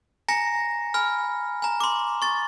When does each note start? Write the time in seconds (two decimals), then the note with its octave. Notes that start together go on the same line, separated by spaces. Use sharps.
0.28 G#5 A#5 A#6 C#7
0.94 G#5 B5 F6
1.62 G#5 A#5
1.80 C6 D6
2.22 C#6 A6